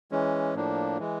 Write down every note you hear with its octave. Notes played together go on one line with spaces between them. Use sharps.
E3 G#3 C#4
A2 F3 A#3 D4
E3 G#3